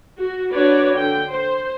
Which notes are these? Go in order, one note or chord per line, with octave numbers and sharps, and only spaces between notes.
F#4
D4 F#4 B4 C#5 D5
D3 G5
C5